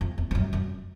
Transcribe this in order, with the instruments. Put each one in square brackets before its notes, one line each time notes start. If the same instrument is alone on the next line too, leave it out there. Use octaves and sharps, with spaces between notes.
[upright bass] F2
E2
F2
F#2
F#2